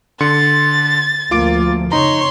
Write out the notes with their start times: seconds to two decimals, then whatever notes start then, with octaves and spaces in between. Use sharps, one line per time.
0.20 D3 C6 A6 C#7
1.31 D2 F3 A#3 F4 D6 D7
1.92 F2 C#3 D#4 C#5 A#5 C6